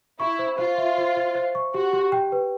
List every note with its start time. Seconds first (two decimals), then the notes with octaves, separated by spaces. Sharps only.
0.20 E4 C#6
0.39 C5
0.58 F4 C5
0.78 E5
0.98 C5
1.16 C5
1.35 C5
1.55 C#6
1.74 F#4 G4
1.93 G4
2.12 G5
2.32 B4